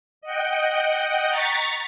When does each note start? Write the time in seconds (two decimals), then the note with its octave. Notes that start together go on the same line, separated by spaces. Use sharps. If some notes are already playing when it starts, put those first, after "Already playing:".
0.22 D#5 F#5 G5
1.30 A#5 C#6 A6 B6